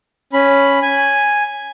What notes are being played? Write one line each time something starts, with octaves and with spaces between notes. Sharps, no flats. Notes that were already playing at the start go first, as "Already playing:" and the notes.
C#4 B5
G#5